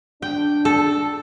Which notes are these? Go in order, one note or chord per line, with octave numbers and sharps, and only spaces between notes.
D4 G5
A4